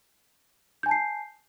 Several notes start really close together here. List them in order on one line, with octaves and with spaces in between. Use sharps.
G6 G#5 A5 C7